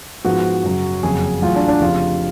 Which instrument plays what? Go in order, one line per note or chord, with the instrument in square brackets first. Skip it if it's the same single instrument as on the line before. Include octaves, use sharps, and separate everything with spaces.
[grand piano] G#2 F3 B3 [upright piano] F#4
[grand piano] F#2 C#3 F#3
[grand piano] F#1 F2 C#3 F#3 [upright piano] G#4
[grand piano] A1 A2 F#3 [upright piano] F4
[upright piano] D4
D4
[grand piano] F1 F2 C#3 [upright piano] F4